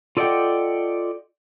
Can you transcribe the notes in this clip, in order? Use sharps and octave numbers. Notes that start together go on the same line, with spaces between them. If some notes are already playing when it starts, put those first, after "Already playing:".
F4 A4 D5 D#5 F#5 G5